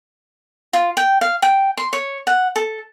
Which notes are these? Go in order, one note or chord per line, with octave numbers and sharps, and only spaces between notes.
F4
G5
F5
G5
C6
C#5
F#5
A4